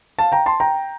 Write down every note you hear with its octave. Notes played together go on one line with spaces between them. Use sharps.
F5 A5
G5 A#5
A5 C6
G5 A#5